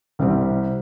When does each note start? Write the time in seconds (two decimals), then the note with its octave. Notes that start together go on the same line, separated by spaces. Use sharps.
0.19 C2 C3 G3 C4